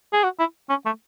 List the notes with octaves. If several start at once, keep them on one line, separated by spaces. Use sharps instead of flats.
G#4
F#4
E4
C#4
A3